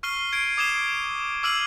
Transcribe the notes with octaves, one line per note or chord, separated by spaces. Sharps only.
C#6 F6 C7 D#7 G7
G#6 C7 D7
D6 D#6 G#6 C7 E7 G7
D6 E6 F6 C7 D#7 F#7